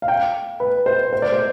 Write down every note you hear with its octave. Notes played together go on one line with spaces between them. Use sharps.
F5
G5
B4
C5
C5
D5
C5